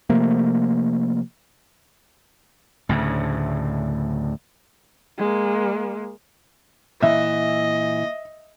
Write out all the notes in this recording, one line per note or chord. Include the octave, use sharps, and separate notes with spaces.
C3 F3 A3 A#3
D2 A2 C#3
G#3 A#3
A#2 E3 D#5 E5